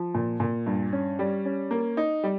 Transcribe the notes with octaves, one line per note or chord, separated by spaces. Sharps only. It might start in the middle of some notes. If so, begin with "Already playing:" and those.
Already playing: F3
A#2
A#2
G2
C#4
G3
C#4
A#3
D#4
G3